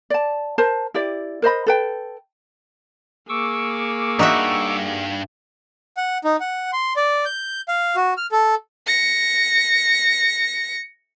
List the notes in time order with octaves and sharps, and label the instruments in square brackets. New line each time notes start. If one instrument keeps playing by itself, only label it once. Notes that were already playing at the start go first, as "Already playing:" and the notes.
[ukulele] D5 A5
A#4 C5 A5
E4 G4 D5
A#4 C5 D#5 B5
A4 B4 G5
[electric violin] A#3 G#4 [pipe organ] C#6 D6 E6
[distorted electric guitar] G2 [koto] D#4 F#4 E5
[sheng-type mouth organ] F#5
D#4
F#5
C6
D5
G6
F5
F#4
F6
A4
[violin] A#6 C#7